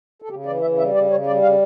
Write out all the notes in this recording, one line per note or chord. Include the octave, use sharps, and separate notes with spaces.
A4
C#3 G4
E3 D5
C#3 E5
G3 E5
C#3 D5
C#3 C#5
G3 D5
C#3 F5